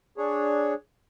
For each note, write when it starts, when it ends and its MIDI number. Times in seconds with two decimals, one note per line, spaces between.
0.18 0.74 62
0.18 0.74 68
0.18 0.74 73